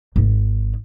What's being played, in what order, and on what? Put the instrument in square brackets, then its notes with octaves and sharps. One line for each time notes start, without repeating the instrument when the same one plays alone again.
[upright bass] G#1 D#4